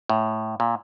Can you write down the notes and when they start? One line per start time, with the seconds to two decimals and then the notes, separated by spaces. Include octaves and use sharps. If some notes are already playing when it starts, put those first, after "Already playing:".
0.10 A2
0.60 A#2